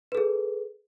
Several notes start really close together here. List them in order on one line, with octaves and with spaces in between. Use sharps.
B4 A4 G#4